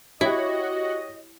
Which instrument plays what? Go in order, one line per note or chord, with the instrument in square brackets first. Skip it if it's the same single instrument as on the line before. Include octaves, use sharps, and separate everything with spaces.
[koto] E4 [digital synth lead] F#4 [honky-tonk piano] G4 C#5 [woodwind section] D#5